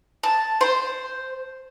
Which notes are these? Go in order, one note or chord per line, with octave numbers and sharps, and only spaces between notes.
A5
C5 C6